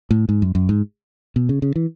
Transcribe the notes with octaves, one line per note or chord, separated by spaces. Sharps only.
A2
G#2
F#2
F#2
G#2
B2
C#3
C#3
E3